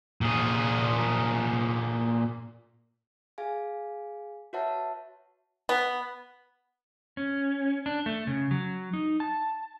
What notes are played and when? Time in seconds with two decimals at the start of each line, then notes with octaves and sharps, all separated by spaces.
0.21 A#2 G#4
3.38 G#4 F5 G#5
4.53 F#4 B4 C#5 E5 F#5 A5
5.69 B3
7.17 C#4
7.86 D4
8.06 A3
8.27 C#3
8.51 F#3
8.93 D#4
9.20 A5